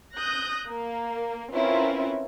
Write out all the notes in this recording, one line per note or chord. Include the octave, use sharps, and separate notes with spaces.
D#6 F#6 G6 A#6
A#3
C4 C#4 E4 F4 A#4 B4